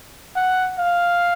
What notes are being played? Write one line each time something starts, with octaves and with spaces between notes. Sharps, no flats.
F#5
F5